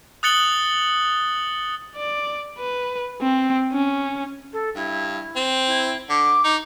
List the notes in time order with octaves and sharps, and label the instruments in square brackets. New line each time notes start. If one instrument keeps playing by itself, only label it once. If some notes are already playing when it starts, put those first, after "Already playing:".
[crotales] D#6 F#6 A6 C#7 F#7 G7
[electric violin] D5
B4
C4
C#4
[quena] A4
[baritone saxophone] G2 [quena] E4
[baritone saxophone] C4
[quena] E4
[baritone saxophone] D3 [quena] D6
[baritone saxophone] D#4